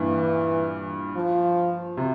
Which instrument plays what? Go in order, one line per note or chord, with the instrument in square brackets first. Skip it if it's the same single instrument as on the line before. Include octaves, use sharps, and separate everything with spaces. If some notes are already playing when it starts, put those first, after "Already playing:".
Already playing: [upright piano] G2 A#2 [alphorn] E3
[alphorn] F3
[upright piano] C3